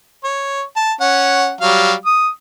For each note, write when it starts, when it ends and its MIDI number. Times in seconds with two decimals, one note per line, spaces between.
0.24 0.63 73
0.76 0.92 81
1.01 1.52 61
1.01 1.52 78
1.61 1.93 54
1.61 1.93 55
1.61 1.93 77
2.05 2.29 87